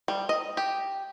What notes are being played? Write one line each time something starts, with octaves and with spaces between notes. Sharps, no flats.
G3
D#5
G4